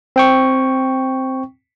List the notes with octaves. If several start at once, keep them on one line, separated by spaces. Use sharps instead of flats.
C4 G5 C#6